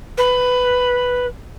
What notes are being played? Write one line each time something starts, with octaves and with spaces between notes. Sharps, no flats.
B4